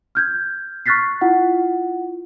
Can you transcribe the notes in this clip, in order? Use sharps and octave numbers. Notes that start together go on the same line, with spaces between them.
F6 G6 G#6
C#6 F6 F#6 A6 B6 C7
E4 F4 F#5